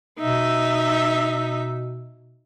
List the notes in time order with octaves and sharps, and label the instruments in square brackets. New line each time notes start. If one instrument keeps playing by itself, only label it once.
[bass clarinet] B2 [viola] D#4 E5